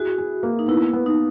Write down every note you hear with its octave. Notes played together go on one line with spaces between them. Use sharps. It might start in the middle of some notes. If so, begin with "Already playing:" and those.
Already playing: E4 F#4 G#4
G#4
A#3
D#4
B3 E4
B3
D#4